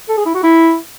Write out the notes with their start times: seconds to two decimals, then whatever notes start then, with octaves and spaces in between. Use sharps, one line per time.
0.09 A4
0.18 G#4
0.26 E4
0.35 F#4
0.43 E4